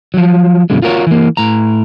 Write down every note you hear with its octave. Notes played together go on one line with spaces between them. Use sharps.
F3 F#3
F#2 B2 D3 G#3
F4 F#4 A#4 C5 C#5
E3 A#3
A2 A#5